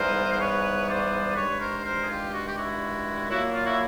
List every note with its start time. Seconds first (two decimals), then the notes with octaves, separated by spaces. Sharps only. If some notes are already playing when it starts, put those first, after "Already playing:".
Already playing: G#2 E3 G3 B3 A#4 C5
0.30 C5
0.39 B4 C#5
0.87 C5 D5
1.36 G2 D#3 G#3 B4 C#5
1.60 A#4 C5
1.84 A#4 C5
2.01 G#4
2.08 F4 G4
2.33 F#4
2.45 G4
2.57 E4 F#4
3.29 A#2 F#3 A#3 E4 F#4
3.53 F4
3.65 E4 F#4